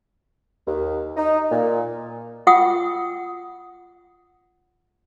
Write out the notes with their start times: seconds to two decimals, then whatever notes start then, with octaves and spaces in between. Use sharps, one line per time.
0.67 D#2
1.17 D#4
1.51 A#2
2.47 F4 F#5 G5 D#6 E6